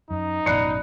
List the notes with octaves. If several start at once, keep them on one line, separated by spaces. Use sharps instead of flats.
F#2 D#4
A1 F#2 B2 D5 B5 F#6 C7 C#7